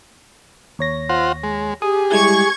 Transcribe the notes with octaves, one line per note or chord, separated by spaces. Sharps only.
D#2 C#5 A#6
F4 C5 F#5
G#3
G4 G#4 D#6
G3 G#3 E4 C#6 G#6